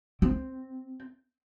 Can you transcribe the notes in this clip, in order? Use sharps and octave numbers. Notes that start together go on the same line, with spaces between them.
C4